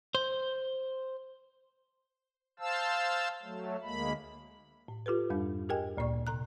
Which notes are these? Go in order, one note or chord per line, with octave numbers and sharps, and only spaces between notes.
C5
C5 F5 A5 E6
F#3 A3
D2 G#3 A#3 B5
A2
F4 G4 A4 B4
F2 G#2 G3 D4
G4 G#4 A#4 D#5 G5 G#5
D2 A#2 A#3 D5 C#6
C3 A#5 F#6